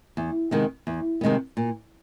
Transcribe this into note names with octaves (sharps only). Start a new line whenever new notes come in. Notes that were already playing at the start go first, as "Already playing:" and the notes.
E2
C3 D#3 G#3 B3
E2
C3 D#3 G#3 B3
A#2